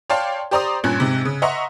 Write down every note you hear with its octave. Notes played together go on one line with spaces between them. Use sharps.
C#5 D5 F5 G5 A5 C6
G4 C5 D5 A#5 C6 D#6
G2 A#2 C#4 F#6 G#6
G#2 C3
C#3
D#5 E5 F#5 A#5 C6 C#6